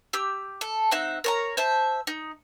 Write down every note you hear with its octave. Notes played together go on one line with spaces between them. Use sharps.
G4 E6
A4
C4 D#4 E5 F#5
A#4 C#5 A#5
C5 E5 A5
D#4